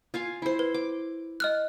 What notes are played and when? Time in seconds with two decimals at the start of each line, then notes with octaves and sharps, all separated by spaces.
0.14 F4 F5 G#5
0.42 E4 C5
0.59 B4
0.74 D6
1.40 D#5 F6 F#6